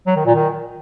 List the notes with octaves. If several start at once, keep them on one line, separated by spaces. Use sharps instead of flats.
F#3
D#3
A#2
D#3